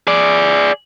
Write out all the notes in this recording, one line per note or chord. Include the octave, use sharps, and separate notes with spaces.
G#4 D5